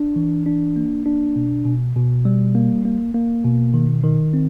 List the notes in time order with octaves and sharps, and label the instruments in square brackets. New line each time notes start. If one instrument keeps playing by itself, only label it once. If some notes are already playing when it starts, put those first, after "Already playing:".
Already playing: [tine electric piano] D4
E3
D4
A#3
D4
B2
B2
B2
G3
A#3
A#3
A#3
B2
D#3
D#3
C4